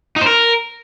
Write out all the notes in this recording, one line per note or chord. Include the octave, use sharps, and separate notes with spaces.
D#4
C5
A#4